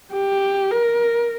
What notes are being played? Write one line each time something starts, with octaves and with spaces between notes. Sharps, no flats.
G4
A#4